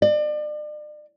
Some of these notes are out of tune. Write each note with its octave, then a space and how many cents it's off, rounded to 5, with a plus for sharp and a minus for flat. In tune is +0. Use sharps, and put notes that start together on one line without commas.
D5 +40